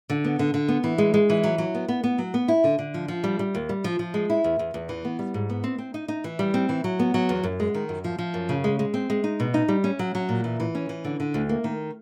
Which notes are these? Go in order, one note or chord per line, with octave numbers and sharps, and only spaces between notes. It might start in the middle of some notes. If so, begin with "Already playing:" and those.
D3
B3
D3
D3
B3
E3
G#3
G#3
E3
F#3
F#3
B3
B3
B3
F#3
B3
E4
D3
D3
F3
F3
G3
G3
D#2
G3
F3
F3
G#3
E4
E2
E2
E2
E3
B3
G3
G#2
B3
C4
C4
D#4
D#4
E3
G3
C4
E3
F#3
B3
F#3
E2
F#2
G#3
D#3
F#2
F3
F3
F#2
C#3
G#3
G#3
C4
G#3
D#4
B2
D#4
G3
C#4
F#3
F#3
A#2
E3
E3
C#4
E3
D3
D3
D2
A#3
D#3